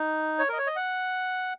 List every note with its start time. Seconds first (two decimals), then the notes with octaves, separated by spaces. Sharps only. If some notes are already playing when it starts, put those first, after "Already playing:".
Already playing: D#4
0.39 C#5
0.49 A#4 D#5
0.58 C#5
0.67 D#5
0.76 F#5